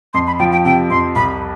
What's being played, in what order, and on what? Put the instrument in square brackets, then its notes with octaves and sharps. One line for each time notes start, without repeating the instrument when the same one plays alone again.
[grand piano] F2 [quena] C6
[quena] B5
[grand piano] F3 [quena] G5
[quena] G5
[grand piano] C3 [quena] G5
[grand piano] F2 [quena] C6
[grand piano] C2 [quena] B5